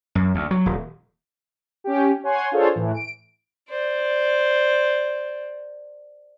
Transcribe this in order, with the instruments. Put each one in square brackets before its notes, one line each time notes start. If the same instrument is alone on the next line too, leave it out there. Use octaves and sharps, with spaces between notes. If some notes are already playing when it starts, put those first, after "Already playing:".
[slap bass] F#2
D2
F#3
D#1
[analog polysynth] C#4 G4
C#5 F#5 G#5 C6
D4 F4 G#4 A4 C5 C#5
A2 E3
D7
[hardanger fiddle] C5 D5